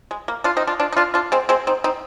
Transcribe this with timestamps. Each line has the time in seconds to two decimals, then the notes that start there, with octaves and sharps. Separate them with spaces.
0.11 G#3
0.28 A#3
0.44 D4 F4
0.57 C4 D#4
0.67 D4 F4
0.80 D4 F4
0.92 D#4
0.97 D4 F4
1.14 D4 F4
1.32 G#3 C4
1.49 G#3 C4
1.67 C4 D#4
1.84 C4 D#4